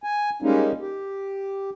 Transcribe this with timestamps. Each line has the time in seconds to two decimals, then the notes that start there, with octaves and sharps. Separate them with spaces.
0.04 G#5
0.42 G3 G#3 A#3 C#4 D#4
0.80 G4